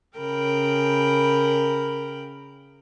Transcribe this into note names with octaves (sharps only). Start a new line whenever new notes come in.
C#3 A#4 G5 B5